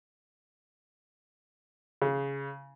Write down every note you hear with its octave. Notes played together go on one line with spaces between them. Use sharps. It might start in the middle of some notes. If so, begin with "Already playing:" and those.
C#3